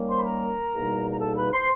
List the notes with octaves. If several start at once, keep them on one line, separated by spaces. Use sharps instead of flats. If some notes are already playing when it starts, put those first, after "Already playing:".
Already playing: D#3 G3 A#3 C#4
C5 C6
B5
A#4 A#5
E2 B2 G3 A#3 D#4
A#5
A4 A5
B4 B5
C5 C6